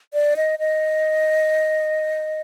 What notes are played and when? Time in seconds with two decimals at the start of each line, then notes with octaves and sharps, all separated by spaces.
0.14 D5
0.36 D#5
0.59 D#5